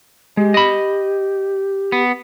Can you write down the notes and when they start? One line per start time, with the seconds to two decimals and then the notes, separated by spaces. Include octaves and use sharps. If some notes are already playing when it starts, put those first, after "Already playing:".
0.37 G#3 G4
0.54 D#5 B5
1.92 B3